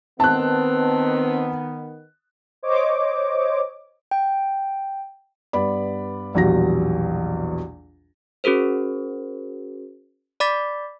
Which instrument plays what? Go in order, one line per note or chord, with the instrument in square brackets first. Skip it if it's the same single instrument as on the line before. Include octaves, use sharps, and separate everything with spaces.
[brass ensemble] D#3 B3 [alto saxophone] C4 [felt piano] A5 F#6
[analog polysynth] C5 C#5 D#5 D6
[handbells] G5
[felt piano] G2 B3 D5 B5
A#1 E2 B2 F#3 G3 A#6
[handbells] C#4 F#4 G#4 A#4 C5
D5 B5 D6 A6 B6